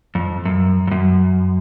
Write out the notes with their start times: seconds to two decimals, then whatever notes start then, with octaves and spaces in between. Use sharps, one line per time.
0.15 F2
0.45 F#2
0.87 F2
0.91 F#2